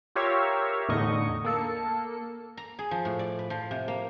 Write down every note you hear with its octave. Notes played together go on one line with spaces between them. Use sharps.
F4 G4 A#4 C#5 E5 F5
E2 A2 D3 D#4 D#5 C#6
A#3 A4 C#7
A#5
G#4
F3
A2
D5
B4
F3
C3
A#3